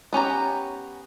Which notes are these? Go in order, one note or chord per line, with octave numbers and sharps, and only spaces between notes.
B3 C#4 G4 A#5